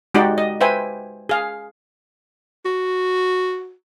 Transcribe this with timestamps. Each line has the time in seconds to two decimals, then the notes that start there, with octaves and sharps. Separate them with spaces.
0.14 G#3 D#4 F#4 G4 D5 G5
0.38 D#5
0.61 B4 C5 E5 G5 G#5
1.29 G#4 F5
2.66 F#4